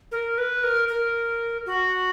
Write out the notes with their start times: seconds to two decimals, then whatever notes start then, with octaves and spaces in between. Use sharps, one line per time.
0.12 A#4
0.38 B4
0.63 A#4
0.88 A#4
1.66 F#4